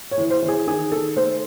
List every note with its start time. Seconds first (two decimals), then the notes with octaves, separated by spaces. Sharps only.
0.11 C#5
0.18 E3
0.30 C5
0.42 E3
0.48 G#4
0.67 D#3 G#4
0.92 D#3 A4
1.16 A3 C5